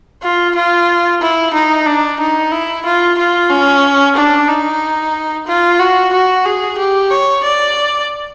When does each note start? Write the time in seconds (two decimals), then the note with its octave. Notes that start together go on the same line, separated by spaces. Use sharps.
0.23 F4
0.55 F4
1.21 E4
1.54 D#4
1.86 D4
2.20 D#4
2.52 E4
2.86 F4
3.18 F4
3.50 C#4
4.16 D4
4.48 D#4
5.47 F4
5.79 F#4
6.13 F#4
6.46 G#4
6.79 G4
7.11 C#5
7.44 D5